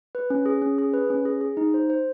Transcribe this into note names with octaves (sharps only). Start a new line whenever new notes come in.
B4
C#4
G#4
C#4
G#4
B4
C#4
G#4
G#4
D#4
C5
C5